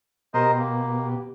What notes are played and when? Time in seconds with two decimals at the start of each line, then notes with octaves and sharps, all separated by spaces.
0.34 B2 G4 A#4 C5 D#5
0.59 A#3